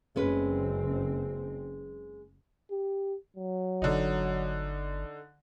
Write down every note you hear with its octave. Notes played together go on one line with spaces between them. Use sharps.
F#1 G#3 C4 C#4 B4
G4
F#3
G1 D3 D#4